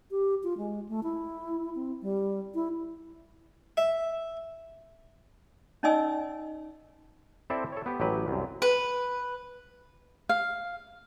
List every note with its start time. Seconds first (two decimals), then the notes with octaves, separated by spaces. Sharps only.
0.11 G4
0.43 F4
0.57 G#3
0.89 A3
1.03 E4
1.75 C4
2.02 G3
2.54 E4
3.77 E5
5.83 C#4 D#4 D5 D#5 G#5 E6
7.50 C4 E4 A4 C5 D5 E5
7.72 A4 C#5
7.86 B3 G4
8.00 A1 F#3 G4 B4
8.28 C2 F#2
8.62 B4
10.29 F5